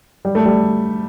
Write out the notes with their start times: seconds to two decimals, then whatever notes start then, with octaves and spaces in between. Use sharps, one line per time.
0.25 G3
0.35 A3
0.46 G3